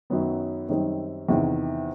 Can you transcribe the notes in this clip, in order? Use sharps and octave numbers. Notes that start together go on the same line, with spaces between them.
F#2 D#3 F#3 B3
F#2 D#3 G3 C4 D#4
E2 C3 D#3